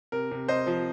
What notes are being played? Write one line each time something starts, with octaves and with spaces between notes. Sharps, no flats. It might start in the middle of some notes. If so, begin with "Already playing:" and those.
C3 A#4
C3
C3 C5 D#5
F3